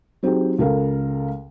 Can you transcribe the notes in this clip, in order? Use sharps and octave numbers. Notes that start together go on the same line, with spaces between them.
F#3 C4 D#4 G4 G#4
C#2 A4 A#4 F5